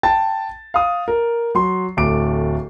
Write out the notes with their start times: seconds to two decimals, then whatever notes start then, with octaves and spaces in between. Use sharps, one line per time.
0.03 G5 A5 A6
0.74 F5 D#6
1.08 A#4
1.55 F#3 C6
1.97 D1 A3 D6 D7